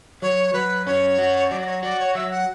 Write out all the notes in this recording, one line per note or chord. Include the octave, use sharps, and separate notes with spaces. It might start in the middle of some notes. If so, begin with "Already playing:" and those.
F#3 C#5
F#3 B4
C#4 C#5
F#4
F#3 D5
D5
C#5
F#4 D5
C#5
F#3 E5
F#5